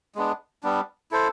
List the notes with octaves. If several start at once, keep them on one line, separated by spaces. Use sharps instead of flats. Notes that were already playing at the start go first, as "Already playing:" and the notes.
G#3 B3 D4
G3 B3 D4
E4 A4 C5